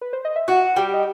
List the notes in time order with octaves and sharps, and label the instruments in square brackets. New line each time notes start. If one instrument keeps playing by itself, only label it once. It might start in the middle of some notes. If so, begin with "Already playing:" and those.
[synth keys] B4
C5
D#5
E5
[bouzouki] F#4 [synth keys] F#5
[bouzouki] G3 [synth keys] G5
[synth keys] D#5